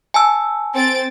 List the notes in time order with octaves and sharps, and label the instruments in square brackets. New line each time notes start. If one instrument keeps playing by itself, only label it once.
[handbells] G#5 A5 E6
[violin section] C4 A6 D7